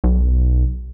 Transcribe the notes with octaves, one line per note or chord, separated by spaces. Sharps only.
B1